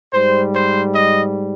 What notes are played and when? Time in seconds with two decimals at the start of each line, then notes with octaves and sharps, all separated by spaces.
0.13 G#2 G3 C5
0.54 C5
0.94 D#5